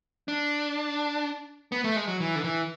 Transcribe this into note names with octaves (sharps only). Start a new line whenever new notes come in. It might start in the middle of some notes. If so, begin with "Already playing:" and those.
D4
B3
A3
G#3
F#3
E3
D3
E3